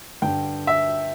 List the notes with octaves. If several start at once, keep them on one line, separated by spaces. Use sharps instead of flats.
G2 D3 G5
E5